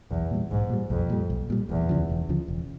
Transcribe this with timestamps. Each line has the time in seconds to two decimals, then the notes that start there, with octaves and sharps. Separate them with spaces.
0.11 B1 E2
0.31 A#2 G3
0.51 B1 G#2
0.70 A#2 G3
0.90 B1 F2
1.10 A#2 G3
1.30 B1
1.50 A#2 G3
1.69 E1 E2
1.89 D2 C#3 F3
2.09 E1
2.29 D2 C#3 F3
2.48 E1